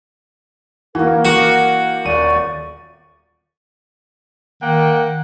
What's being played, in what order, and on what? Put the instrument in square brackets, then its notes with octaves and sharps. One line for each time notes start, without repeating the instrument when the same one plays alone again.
[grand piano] E3 [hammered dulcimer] A#3 F#4 [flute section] A#4
[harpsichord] F#4 [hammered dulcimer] G4
[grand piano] D#1 D#7 [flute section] D5 C#6
[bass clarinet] D#3 [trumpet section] A#3 F#5 G5